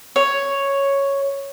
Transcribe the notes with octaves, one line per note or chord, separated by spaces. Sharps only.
C#5